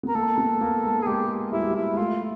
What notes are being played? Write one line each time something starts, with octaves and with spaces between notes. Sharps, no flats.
B3 A#4
A#3 A4
B3
A#3
G#3
G#4
G#3 G4
G3 E4
F#3
G3
E4
G#3
A3 F4